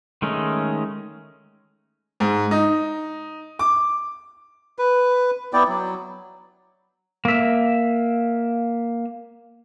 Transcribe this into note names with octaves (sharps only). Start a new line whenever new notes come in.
D#3 G#3 A3 C#4 D#4
G#2
D#4
D6
B4
B3 E4 D5 G5
F#3
A#3 E5